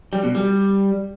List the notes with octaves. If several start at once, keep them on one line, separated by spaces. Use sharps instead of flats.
G3
B2
G3